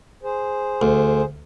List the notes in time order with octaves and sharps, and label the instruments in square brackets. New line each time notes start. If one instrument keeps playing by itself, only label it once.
[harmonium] G#4 C5
[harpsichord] D2